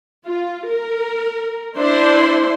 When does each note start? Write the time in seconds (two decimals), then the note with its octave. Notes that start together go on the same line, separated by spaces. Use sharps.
0.25 F4
0.67 A#4
1.77 D4 E4 C5 C6